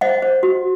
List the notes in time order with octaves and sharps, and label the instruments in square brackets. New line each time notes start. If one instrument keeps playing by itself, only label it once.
[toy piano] C5 D#5 F#5
C5
F#4